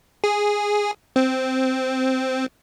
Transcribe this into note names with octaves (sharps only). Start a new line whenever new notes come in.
G#4
C4